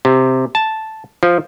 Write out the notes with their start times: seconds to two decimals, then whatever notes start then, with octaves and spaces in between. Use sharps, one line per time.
0.05 C3
0.55 A5
1.23 F3